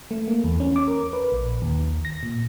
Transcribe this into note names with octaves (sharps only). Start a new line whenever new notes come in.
A3
A#3
E2
C#4
D6
A#4
B4
A#1
D#2
A#6
A#2